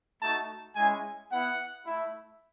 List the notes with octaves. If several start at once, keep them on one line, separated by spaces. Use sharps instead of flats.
A3 D#4 F#4 A5
G#3 C#4 E4 G#5
B3 E4 F#5
A3 E4